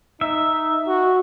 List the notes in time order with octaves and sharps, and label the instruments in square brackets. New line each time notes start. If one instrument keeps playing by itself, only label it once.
[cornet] D#4 [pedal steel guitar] E5
[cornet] F#4